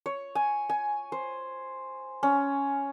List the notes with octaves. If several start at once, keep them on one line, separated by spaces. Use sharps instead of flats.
C#5
G#5
G#5
C5
C#4